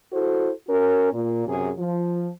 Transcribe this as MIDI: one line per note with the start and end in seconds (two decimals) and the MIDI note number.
0.13 0.50 64
0.13 0.50 66
0.13 0.50 69
0.13 0.50 72
0.67 1.10 61
0.67 1.10 66
0.67 1.10 70
1.12 1.43 46
1.46 1.70 42
1.46 1.70 48
1.46 1.70 68
1.78 2.29 53